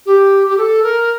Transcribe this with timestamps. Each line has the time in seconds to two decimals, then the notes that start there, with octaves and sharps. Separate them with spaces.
0.06 G4
0.48 G4
0.58 A4
0.83 A#4